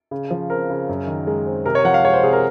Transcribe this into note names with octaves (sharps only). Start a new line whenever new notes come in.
C#3
F3
C4 A#4
C#3
F#2
D#3
G#3
C4
C3 A#4
C#5
F3 F#5
F5
G#3 C#5
C5
C3 G#4
A#4